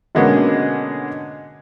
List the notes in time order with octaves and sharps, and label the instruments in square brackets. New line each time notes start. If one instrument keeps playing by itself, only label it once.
[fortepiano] B2 D3 G#3 A#3 B3 C#4